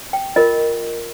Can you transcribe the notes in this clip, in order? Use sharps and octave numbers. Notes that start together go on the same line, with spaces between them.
G5
F4 A#4 D#5